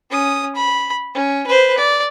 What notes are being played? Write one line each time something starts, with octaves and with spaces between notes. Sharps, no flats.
C#4 D#6
B5
C#4
B4 C5
D5